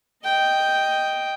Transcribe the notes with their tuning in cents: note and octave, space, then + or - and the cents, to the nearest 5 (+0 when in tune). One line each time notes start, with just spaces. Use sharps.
D#5 +0 G5 +0